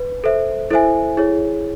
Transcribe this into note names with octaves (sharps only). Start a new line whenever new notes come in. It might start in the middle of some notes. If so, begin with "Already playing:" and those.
Already playing: B4
A4 C5 E5
E4 A4 C5 E5 G#5
E4 G#4 C#5